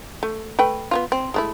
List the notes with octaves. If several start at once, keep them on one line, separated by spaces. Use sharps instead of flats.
A3
A3 B4 G5
B3 C#4 F4
C4
G#3 A3 E4